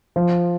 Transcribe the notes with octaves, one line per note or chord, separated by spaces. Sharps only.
F3